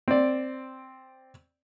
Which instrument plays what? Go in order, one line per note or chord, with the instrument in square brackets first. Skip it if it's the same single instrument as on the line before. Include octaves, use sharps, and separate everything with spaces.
[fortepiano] C4 D5